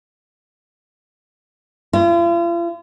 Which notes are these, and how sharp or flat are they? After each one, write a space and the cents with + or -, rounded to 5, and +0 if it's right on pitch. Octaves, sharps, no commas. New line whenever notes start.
F4 -45